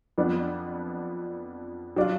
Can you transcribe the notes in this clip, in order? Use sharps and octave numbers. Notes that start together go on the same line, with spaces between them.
F2 F3 B3 D4
F#3 D4 F4